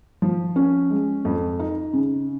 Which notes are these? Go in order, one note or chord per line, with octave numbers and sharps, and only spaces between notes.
F3
C#4
G#3
F2
D#4
C#3